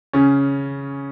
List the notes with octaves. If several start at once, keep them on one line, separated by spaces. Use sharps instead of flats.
C#3 C#4